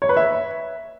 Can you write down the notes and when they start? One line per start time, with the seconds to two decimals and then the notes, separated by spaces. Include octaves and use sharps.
0.02 C#5
0.09 B4
0.17 E5